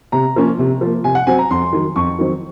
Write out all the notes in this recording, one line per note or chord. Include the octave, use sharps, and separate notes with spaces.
C3 A#5
F3 A#3 C#4
C3
F3 A#3
C3 G#5
F#5
F#3 C4 G#5
A#5
F2 C6
D#3 F#3
F2 C#6
D#3 F#3 C4